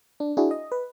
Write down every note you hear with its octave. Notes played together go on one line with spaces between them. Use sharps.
D4
D4 E4 F#4 G#4
D#5
B4